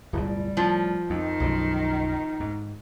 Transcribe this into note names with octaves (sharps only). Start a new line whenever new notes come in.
D1 G1 B2 G3
A2 F3
F2 D#3 D#4
B1 F#2 D3
G#2